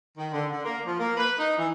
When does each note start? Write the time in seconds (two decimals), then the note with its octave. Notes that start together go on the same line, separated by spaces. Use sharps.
0.18 D#3
0.33 D3
0.52 D3
0.65 A#3
0.86 F3
1.00 A#3
1.17 B4
1.39 D#4
1.58 E3